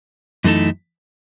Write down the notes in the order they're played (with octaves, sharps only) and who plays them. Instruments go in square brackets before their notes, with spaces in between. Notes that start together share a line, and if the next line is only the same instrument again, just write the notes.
[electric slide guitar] F#2 E3 A3 D#4 A4